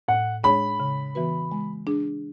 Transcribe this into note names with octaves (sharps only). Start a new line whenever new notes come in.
A2 F#5
G#3 D4 G#4 C#5 B5
C#3
E3 B3 F#4 B4
G#3
D4 G#4